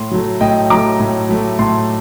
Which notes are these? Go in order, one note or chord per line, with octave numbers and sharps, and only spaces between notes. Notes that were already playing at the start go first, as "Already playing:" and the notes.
Already playing: A2 C6
F#3 A3
A2 D#5 G5
F#3 A3 A#5 D6
A2
F#3 A3
A2 A5 C6